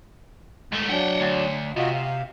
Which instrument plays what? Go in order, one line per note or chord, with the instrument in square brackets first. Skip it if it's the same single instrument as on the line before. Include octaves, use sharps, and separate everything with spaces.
[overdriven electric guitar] G#2 A3
[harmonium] F#3 D4 [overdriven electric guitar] F#5 G5
[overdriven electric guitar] D2
[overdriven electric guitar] C3 [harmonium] F4 F#4 D#5
[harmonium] F5